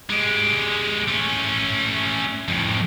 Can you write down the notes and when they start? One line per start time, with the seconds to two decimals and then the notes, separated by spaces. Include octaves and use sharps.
0.09 G#3 G4
1.08 A3 C#4
2.48 F2 A2